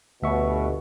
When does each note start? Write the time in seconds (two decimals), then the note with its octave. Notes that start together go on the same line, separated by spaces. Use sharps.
0.22 G1 D2 B2 E5 C#6